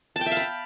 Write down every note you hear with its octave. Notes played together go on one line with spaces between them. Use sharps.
A5
G5
E5
F5
B5